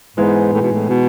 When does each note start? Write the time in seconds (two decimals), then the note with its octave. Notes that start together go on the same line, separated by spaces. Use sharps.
0.16 G#2 E3 G#3 B3 D#4
0.53 A2
0.61 B2
0.72 A2
0.89 B2